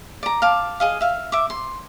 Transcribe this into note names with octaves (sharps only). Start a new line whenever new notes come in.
D5 A#5
F5 A5 D6
G#4 D#5 F5
E5 F5
E5 D6
C6